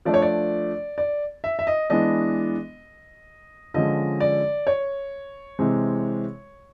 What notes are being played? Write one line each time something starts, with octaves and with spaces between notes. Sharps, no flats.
F3 A3 D4 D5
C#5
D5
D5
E5
E5
D#5
E3 G#3 B3 D4 D#5
D3 F3 G#3 C#4 D#5
D5
C#5
C3 E3 G#3 C4